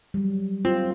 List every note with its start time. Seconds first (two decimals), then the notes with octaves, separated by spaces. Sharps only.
0.14 F#3 G3
0.65 C4 F4